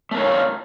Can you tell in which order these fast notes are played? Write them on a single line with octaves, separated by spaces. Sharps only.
A3 A#4 C#5 F4